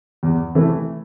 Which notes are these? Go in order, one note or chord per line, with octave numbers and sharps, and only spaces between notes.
E2
C3 E3 A3